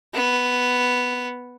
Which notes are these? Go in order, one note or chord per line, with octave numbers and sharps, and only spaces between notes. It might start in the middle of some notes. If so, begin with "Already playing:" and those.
B3